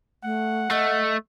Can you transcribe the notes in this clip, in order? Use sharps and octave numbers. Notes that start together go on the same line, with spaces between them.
A3 F#5
A3 D#5